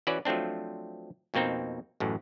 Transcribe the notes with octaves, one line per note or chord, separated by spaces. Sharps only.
E3 C#4 F#4 B4 D5
F3 F#3 A3 C4 D4
F2 B2 A#3 C4 D#4
A1 F#2 A2